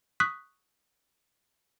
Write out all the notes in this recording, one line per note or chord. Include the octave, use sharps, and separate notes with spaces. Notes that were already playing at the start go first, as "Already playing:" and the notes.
C#6 D#6 F#6 B6